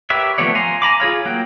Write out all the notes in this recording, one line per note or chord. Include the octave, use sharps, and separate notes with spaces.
G4 A#4 B4 C#5 E5
F3 A3 B3 C#5 D5
F5 G#5 A#5 C6
G#5 A#5 B5 D6
F4 G#4 C#5 F5
F#3 A#3 F#5 G5